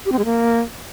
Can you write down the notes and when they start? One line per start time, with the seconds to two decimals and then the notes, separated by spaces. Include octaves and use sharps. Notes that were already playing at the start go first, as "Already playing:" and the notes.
0.06 G4
0.12 C4
0.19 G#3
0.25 A#3